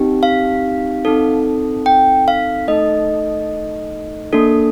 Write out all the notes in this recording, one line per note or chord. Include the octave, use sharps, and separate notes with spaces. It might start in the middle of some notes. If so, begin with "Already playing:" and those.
Already playing: C4 D#4 G4
F5
C4 D#4 A4
G5
F5
A3 D#4 A4 D#5
A#3 D4 A4